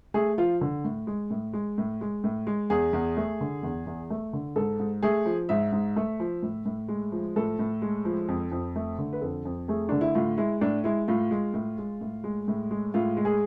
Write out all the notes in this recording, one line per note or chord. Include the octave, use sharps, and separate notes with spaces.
A3 G#4
F3 F4
D3
A2
G#3
A2
G#3
A2
G#3
A2
G#3
E2 G#4
E2
A3
D3
E2
E2
A3
D3
G#2 A4
G#2
A3 G#4
F3
G#2 E5
G#2
A3
F3
A2
A2
G#3
F3
A2 A4
A2
G#3
F3
F2
F2
A3
D3
B4
F2 A4
F2
A3 G#4
D3 D4
E4
A2 F4
G#3 E4
A2 D4
G#3 E4
A2 F4
G#3
A2
G#3
A2
G#3
A2
G#3
A2 F4
G#3
G#4